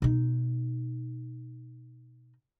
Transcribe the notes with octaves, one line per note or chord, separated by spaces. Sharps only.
B2 D#4